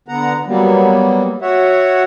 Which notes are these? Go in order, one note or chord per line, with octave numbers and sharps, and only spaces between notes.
D3 B3 F#5 A#5
F#3 G3 A#3 B3
F#4 C#5 E5 F#5